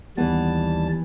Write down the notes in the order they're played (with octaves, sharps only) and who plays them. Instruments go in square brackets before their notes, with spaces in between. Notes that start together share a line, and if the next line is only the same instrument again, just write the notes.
[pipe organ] D#2 G3 A5 [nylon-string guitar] E3 B3